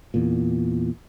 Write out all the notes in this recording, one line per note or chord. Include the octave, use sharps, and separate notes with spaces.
E2 A#2